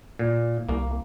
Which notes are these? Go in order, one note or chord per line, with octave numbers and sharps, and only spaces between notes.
A#2
C2 A#3